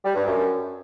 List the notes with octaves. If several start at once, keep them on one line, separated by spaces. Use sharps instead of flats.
G3
G2
F#2